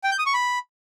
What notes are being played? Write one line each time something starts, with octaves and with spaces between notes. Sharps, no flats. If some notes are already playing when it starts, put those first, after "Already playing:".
G5
G6
D#6
C#6
B5